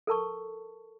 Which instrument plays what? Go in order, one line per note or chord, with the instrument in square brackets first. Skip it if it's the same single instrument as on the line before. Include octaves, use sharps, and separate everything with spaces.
[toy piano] A4 A#4 A5 C#6